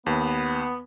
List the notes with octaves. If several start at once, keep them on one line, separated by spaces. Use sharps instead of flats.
D#2 B3